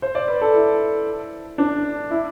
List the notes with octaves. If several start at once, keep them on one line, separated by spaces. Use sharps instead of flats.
C5
D5
B4
A4
E4
D4
E4